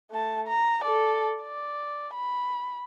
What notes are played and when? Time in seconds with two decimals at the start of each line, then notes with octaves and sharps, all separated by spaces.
0.11 A3 A5
0.48 A#5
0.84 A4 D5
1.43 D5
2.14 B5